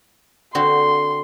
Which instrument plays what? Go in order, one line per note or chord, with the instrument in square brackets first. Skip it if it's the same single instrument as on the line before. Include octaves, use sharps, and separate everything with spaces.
[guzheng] D3 C4 F#4 [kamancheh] C6